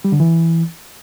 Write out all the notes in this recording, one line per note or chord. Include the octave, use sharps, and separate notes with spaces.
G3
D3
E3